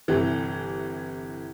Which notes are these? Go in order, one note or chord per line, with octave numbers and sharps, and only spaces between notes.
G1 C3 E3